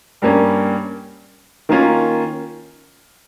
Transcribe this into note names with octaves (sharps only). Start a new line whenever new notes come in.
G2 G3 A#3 C#4
D#3 A#3 C#4 F4